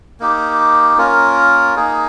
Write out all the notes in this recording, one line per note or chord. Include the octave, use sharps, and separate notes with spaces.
A#3 D#4 G4
A#3 C#4 F4 A#4
A#3 D#4 G#4